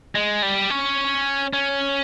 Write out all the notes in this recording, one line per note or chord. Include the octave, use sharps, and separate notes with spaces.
G#3
G3
C#4
C#4